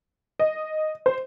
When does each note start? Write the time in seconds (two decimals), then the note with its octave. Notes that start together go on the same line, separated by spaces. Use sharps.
0.39 D#5
1.06 C5